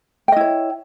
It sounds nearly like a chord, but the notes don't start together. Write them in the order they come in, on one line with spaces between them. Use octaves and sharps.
G5 D#5 E4 C#5